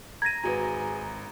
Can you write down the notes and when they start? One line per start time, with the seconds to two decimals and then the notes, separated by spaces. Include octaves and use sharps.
0.22 A#5 G#6 A#6 D#7
0.44 G#1 F#4 G#4 B4 A#5